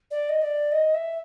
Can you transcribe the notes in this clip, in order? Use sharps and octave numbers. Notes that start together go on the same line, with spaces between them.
D5
D#5
D5
D#5
E5